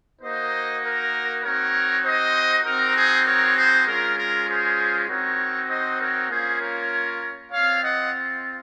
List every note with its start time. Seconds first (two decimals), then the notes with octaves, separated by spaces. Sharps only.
0.21 A#3 D#4 F#4 C5 D#5
0.83 A#4
1.43 C4 D#4 F#4 A#4 C#5
2.04 C5 D#5
2.64 C4 D#4 F#4 A#4
2.95 G#4 C5
3.26 A#4 C#5
3.56 G#4 C5
3.86 G#3 C#4 F4 A#4
4.17 A#4
4.47 G#4 C5
5.08 C4 D#4 F#4 A#4 C#5
5.69 C5 D#5
5.99 A#4 C#5
6.29 A#3 C#4 F4 G#4 C5
6.60 A#4 C#5
7.51 C4 F4 C#5 F5
7.82 D#5 F#5